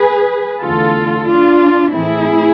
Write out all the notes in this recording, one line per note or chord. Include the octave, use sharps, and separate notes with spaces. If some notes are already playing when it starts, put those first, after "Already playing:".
Already playing: G#4 B4
E2 D3 A3 F4 A4
D4 F4
A2 E3 A3 C4 E4 G#4